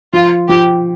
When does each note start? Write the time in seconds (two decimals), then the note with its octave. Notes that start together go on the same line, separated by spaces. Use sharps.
0.13 F3 F4
0.49 F3 G4